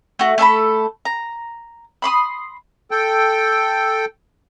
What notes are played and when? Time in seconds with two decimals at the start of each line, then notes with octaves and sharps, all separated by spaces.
0.19 A3 F#4
0.38 A3 A4 A5 B5
1.05 A#5
2.02 B5 C6 D6 D#6
2.91 A4 G5